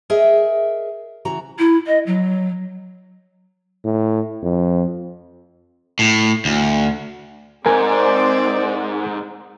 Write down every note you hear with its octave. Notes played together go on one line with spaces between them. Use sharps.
G#4 A#4 D#5 E5
C#3 E3 F#4 A#5
E4
D#5
F#3
A2
F2
A2
D2
G#2 C4 A#4 D5 G#5